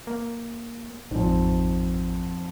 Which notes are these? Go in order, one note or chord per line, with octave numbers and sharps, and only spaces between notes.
A#3
A1 F2 G#2